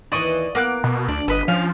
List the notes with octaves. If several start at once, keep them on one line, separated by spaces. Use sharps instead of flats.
D#2 E3 D5 D#5 C#6
A#3 B3 D6 F#6
B2
D2 D4 D5
G1 B3 A4 B4 D#5
F3 C#4 F5